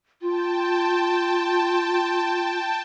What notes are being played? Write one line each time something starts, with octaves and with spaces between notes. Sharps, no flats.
F4 G5 A5